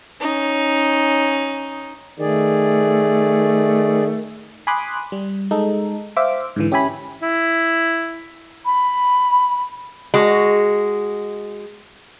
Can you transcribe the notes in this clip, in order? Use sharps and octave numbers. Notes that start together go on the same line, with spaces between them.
C#4 D#4
D#3 A3 G#4 D5
G#5 B5 C6 D6 D#6 F#6
G3
G#3 D#4 A4
C5 E5 F5 D6
G#2 D3 E3
C#4 G4 E5 G#5 B5
E4
B5
G#3 F#4